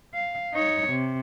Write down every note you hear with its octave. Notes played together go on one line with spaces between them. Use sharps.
F5
D#4 C#5
C3